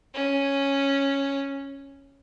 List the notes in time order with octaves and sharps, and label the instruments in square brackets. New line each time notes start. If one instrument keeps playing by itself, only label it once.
[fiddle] C#4